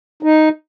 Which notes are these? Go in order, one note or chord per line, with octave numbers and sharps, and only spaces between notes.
D#4